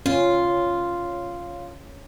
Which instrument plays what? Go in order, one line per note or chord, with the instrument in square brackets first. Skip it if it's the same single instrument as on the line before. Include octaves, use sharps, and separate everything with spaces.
[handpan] C#4 [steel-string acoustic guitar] F4